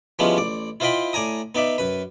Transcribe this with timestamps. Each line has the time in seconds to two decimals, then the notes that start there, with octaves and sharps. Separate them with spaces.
0.19 F3 G3 G#3 B3 C#4 E4
0.37 A1 D5
0.80 E4 F4 C5 D#5 G5 B5
1.13 A2 D5 G#5 A#5 D#6
1.55 B3 D#4 D5 E5
1.78 F#2 B4